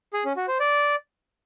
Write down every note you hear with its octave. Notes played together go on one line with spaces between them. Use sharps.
G#4
C#4
F#4
C5
D5